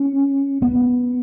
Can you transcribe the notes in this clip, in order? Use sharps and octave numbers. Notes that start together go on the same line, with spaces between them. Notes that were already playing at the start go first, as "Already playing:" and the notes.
Already playing: C#4
B3